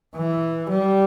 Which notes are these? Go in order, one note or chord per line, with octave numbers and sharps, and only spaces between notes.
E3
G3